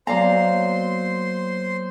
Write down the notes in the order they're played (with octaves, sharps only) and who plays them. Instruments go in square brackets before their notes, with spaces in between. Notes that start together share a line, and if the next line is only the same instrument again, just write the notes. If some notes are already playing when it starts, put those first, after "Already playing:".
[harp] F#3 A#3 B3 [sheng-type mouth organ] C5 C6 [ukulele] D5 F5 A#5